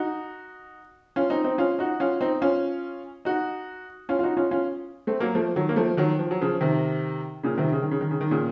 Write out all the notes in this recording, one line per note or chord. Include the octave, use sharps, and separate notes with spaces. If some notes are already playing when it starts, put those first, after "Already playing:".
Already playing: D#4 F#4
C#4 F4
C4 D#4
C4 D#4
C#4 F4
D#4 F#4
C#4 F4
C4 D#4
C#4 F4
D#4 F#4
C#4 F4
F4
D#4 F#4
C#4 F4
C#4 F4
A3 C4
F#3 A#3
F3 A3
D#3 F#3
A#3
F3 A3
D#3 F#3
F3
F#3
C#3 F3
C3 D#3
A#2 C#3
C3 D#3
C#3
D#3
C#3
D#3
C#3
D#3
A#2 C#3